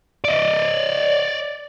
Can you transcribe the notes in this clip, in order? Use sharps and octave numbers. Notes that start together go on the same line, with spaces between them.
D5 D#5